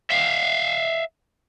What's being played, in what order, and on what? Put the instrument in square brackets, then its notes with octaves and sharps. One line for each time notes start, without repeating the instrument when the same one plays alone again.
[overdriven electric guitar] E5 F5